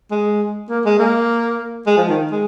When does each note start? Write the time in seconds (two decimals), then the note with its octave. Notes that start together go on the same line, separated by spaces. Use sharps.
0.11 G#3
0.69 A#3
0.85 G#3
0.99 A#3
1.87 G#3
1.97 F3
2.09 D#3
2.31 G#3